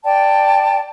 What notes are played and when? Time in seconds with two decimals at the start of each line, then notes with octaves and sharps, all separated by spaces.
0.04 D5 G5 A5